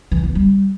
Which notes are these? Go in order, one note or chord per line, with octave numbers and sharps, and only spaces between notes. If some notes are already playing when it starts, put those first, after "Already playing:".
E3
B3
G3